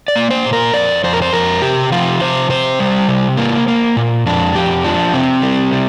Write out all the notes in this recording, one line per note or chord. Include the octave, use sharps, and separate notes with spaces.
D5
A#3
C5
A#2
A#4
F2 D5
F2 C5
A#4
C5
F2 A#4
C3 G4
F3 F4
C3 C5
C3 C5
G3
C3
A#3
A#3
A#2
F2 D4
F2 G4
F3 D4
C3 C4
G3
C3